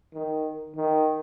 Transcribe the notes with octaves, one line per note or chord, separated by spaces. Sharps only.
D#3
D#3